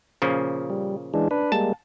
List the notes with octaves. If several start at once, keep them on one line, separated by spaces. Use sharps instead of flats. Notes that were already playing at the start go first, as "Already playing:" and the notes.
A#2 C#3 F3
G3
E3 G#3 D4
D4 B4
G3 G#3 A#3 A5